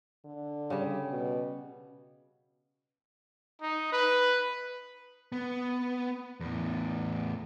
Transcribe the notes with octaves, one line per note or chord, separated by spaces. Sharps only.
D3
C#3 G3
B2
D#4
B4
B3
E2 A2